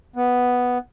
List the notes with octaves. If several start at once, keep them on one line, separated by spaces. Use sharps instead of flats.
B3